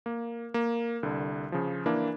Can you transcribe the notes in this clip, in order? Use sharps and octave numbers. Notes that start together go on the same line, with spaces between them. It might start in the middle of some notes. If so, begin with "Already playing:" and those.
A#3
A#3
C2 D3
C#3 F3
E3 A#3 D4 E4